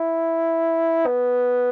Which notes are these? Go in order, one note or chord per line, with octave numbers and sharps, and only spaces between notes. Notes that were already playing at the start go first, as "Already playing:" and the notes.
Already playing: E4
B3